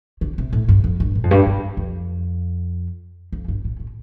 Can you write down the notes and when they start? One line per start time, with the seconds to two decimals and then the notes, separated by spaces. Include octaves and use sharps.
0.21 D3
0.38 C3
0.53 A2
0.69 G2
0.84 F2
1.00 G2
1.15 A2
1.24 F2
1.31 G2
1.46 G2
1.77 F2
3.32 F2
3.48 G2
3.65 A2
3.80 A2